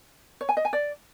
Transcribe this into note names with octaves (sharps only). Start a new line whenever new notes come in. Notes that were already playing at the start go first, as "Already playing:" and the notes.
C#5
G#5
D#5
G#5
D5